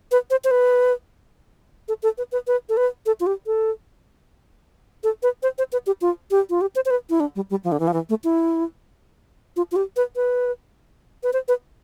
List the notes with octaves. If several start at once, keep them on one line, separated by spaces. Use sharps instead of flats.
B4
C5
C5
B4
A4
A4
B4
B4
B4
A4
B4
A4
F4
G4
A4
A4
B4
C5
C5
B4
G4
F4
G4
F4
G4
C5
C5
B4
E4
D4
G3
G3
F3
D3
E3
F3
E3
A3
E4
F4
F4
G4
B4
B4
B4
C5
B4